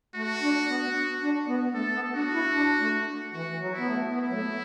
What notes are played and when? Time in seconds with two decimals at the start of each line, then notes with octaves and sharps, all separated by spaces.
0.16 A3 F#4
0.42 D4
0.68 B3
1.22 D4
1.48 B3
1.74 A3 A4
1.94 B3
2.14 D4 F#4
2.34 E4
2.54 D4
2.80 A3
3.33 E3 F#4
3.59 F#3
3.73 E4
3.79 B3
3.87 A3
4.13 B3 E4
4.29 F#3
4.33 A3